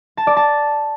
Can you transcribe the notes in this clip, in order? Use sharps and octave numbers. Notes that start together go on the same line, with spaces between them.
A5
D5
A5